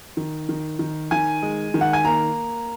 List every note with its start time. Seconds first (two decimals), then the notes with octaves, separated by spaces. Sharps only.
0.17 D#3
0.49 D#3
0.79 D#3
1.11 D#3 G#5
1.42 G#3
1.74 D#3
1.81 F#5
1.93 G#5
2.05 A#3 A#5